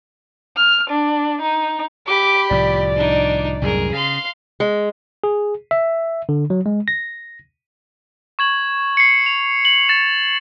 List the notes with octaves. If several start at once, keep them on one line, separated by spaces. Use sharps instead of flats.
F6
D4
D#4
G4 B5 D6
C2 A2 F3 D5
D4 D#4
C2 F#2 A2 G#4 A#4
C#3 F5 C6
G#3
G#4
E5
D3
F#3
G#3
A#6
C#6 G#6 F#7
C7 C#7
F7
F#7
A6 E7